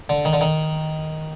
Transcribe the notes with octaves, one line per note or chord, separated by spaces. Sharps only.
D3
D#3
D3
D#3